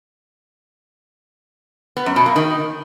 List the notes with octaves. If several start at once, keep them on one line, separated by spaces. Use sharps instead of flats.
B3
F#2
B2
A#3
D#3